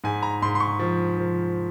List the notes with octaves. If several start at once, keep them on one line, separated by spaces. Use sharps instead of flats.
G#2 G#5
A#5
G#2 C6
C6
C#6
F3
F3